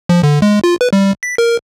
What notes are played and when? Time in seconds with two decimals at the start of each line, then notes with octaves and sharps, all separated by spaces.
0.09 F3
0.23 D3
0.42 G#3
0.64 F4
0.81 B4
0.93 G3
1.23 B6
1.38 A#4